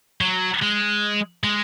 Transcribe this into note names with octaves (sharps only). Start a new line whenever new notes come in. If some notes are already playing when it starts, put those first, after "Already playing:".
F#3
G#3
G#3